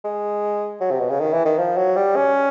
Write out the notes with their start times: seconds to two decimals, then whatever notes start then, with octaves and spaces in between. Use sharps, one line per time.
0.05 G#3
0.81 F#3
0.91 C3
1.00 B2
1.10 C#3
1.20 D#3
1.33 E3
1.45 D#3
1.58 F3
1.77 F#3
1.96 G3
2.16 C#4